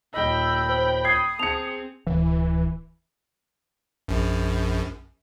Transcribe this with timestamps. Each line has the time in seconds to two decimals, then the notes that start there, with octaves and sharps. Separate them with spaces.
0.14 D#1 D#5 G5 B5 E6
0.69 C5
1.05 D#6 G#6 C7
1.39 C4 G#4 A5 C#7 F7
2.07 D1 E3
4.08 A#1 F#2